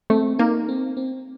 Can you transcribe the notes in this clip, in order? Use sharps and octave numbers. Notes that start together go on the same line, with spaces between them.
A3 C4
A#3 D#4
C4
C4